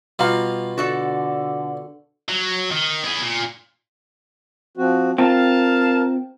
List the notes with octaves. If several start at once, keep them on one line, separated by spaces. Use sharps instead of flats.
B2 G3 F4 F5 A#5
D3 F#4 A4 D5
F#3
D#3
E4 G#4
A#2
F3 C4 F#4
C4 F4 A#4 F5 A5